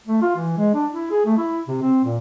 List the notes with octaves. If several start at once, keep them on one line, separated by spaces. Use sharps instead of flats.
A3
F4
E3
G#3
D4
E4
G#4
A3
E4
C3
C4
A#2